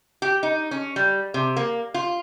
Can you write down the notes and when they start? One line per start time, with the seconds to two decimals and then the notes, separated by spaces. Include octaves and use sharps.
0.22 G4
0.43 D#4
0.71 C#4
0.96 G3
1.34 C3
1.56 A#3
1.94 F4